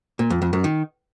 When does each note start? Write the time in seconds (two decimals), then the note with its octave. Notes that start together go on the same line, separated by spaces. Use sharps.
0.19 A#2
0.30 F2
0.42 F2
0.53 F#2
0.64 D#3